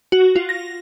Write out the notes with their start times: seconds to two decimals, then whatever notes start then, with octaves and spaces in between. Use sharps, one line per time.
0.12 F#4
0.36 F4
0.49 A#6